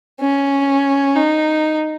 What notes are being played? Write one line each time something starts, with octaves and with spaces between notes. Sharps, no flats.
C#4
D#4